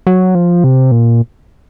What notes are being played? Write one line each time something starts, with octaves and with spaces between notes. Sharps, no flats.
F#3
F3
C3
A#2